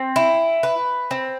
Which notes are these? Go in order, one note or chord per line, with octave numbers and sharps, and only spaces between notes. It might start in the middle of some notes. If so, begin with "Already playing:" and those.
Already playing: C4
E4
B4
C4